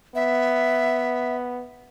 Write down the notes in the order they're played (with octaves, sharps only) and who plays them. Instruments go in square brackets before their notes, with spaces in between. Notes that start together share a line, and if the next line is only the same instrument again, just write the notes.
[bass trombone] B3 [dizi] E5